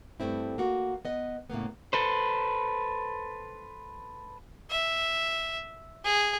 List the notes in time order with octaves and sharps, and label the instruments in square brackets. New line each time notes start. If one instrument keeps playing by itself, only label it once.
[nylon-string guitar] G2 A3 C4 E4
A#3 F#4
B3 D#5
A2 C#3 A#3 B3
[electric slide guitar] A4 B4 C5
[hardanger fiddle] E5
G#4